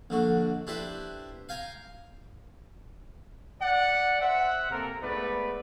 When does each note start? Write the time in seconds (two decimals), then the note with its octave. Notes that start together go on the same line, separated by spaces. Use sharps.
0.10 A#1 D3 F#4
0.67 D4 E4 G4 B4 C5
1.49 F5 G5 G#5 A#5
3.62 D5 F#5
4.21 C5 E5 F#5
4.70 C3 A#3 A4 A#4
5.02 G#2 A3 B3 B4 D5